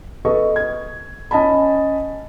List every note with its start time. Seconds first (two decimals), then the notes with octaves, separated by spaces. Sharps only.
0.25 A4 B4 D#5 C#6
0.56 G#6
1.31 C#4 D#5 A5 B5